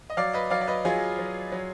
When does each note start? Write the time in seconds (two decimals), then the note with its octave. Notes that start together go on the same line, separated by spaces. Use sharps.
0.10 D#5
0.17 F#3 D5 F5
0.33 B4 D#5
0.50 F#3 D5 F5
0.61 D5
0.67 B4 D#5
0.85 F#3 F4 G#4
1.18 F#3
1.52 F#3